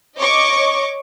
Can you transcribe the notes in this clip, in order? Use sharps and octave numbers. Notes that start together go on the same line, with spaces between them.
C#5 D#5 C#6 D6